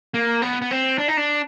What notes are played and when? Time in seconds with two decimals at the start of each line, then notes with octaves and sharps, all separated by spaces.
0.14 A#3
0.42 B3
0.62 B3
0.71 C4
0.98 D4
1.08 D#4
1.17 D4